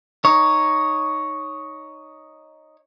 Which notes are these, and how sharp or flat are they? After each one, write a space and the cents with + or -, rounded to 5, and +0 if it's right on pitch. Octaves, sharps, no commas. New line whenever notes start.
D#4 +0 C#5 +0